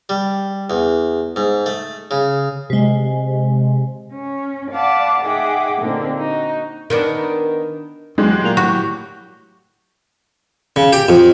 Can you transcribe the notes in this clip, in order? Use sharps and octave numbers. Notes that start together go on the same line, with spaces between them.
G3
E2
G#2
A3
C#3
C3 G#3
C#4
D5 F5 F#5 A5 B5 D6
D#4 G#4 E5 F#5 G5 D6
A#2 D3 A#3 C4 D4 D#4
D#4 F#4
D#3 B3 D4
E2 F#3 G#3 G4
A#2
A2 F#4 C#6
C#3
G4
F2